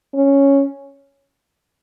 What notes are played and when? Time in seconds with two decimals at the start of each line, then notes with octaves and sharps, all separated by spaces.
0.14 C#4